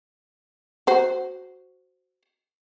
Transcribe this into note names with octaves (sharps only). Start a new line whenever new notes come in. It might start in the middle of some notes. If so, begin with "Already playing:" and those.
F#4 C5